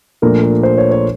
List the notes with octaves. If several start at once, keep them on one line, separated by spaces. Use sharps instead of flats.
A#2 F3 A3 D4 A#4
A#4
C5
C#5
C#5